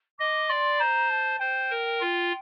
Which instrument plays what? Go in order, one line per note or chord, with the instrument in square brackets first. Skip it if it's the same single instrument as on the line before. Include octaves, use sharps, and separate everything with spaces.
[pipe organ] D#5 [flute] D6
[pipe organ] D5 [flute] C6
[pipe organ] C5 [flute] A#5
[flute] A5
[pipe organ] C5 [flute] G5
[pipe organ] A#4
F4